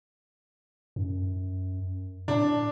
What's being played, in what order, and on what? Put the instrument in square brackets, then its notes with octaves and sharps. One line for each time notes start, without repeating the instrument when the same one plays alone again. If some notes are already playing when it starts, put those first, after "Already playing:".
[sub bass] F#2
[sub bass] A2 [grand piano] D4